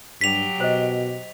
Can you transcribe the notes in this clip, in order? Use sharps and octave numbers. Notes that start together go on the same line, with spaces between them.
G2 F#3 G4 B6 F7
B2 C5 D#5